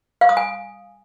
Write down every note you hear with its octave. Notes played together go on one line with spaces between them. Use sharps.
F5
D#6
G#5